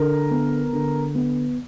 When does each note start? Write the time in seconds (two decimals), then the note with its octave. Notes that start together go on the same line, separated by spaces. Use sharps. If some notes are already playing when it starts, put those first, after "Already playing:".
Already playing: D3 A#4
0.31 B3
0.73 D3
1.15 B3